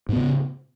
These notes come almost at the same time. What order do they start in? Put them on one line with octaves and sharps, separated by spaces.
G#2 B3 C#3